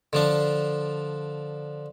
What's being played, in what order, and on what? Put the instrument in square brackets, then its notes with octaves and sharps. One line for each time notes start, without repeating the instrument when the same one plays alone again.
[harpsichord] D3 F3 D4